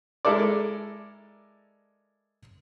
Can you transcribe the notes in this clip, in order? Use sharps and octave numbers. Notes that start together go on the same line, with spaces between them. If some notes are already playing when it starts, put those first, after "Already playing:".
G#3 E4 A4 A#4 D5